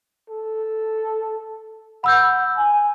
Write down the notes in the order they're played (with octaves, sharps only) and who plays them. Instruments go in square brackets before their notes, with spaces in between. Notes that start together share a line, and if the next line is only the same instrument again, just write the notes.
[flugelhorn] A4
[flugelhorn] F#5 [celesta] B5 E6 G6
[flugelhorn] G#5